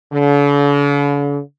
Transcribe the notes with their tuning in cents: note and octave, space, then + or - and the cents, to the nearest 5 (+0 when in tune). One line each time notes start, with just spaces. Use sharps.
D3 -45